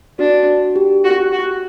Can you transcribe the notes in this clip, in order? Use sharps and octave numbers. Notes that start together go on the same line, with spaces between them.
D4 F#4
G4
F#4
F#4